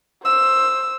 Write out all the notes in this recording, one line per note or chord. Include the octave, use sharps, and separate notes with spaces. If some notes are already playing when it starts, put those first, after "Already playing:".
C5 E6